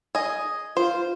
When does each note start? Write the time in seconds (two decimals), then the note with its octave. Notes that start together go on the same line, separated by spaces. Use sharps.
0.15 G#4 D#5
0.77 F4 C5